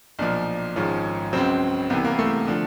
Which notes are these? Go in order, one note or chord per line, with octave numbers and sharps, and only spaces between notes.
B1 A#2 F3 D4
G#1 G#2 F3 C#4
C#2 C#3 F#3 C4
C2 C3 E3 B3
A#3
A3
D3 F3